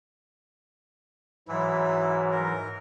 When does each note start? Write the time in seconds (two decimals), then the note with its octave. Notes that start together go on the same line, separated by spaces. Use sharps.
1.48 G#2 E3 F#3 E4
2.31 A#4